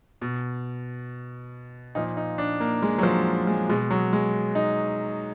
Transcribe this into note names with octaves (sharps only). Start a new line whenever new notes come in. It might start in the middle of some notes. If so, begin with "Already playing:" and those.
B2
A#2 F3 D#4
D#4
D4
A#3
G#3
F#3
F3
G#3
B2 G#3
F#3
G#3
D#4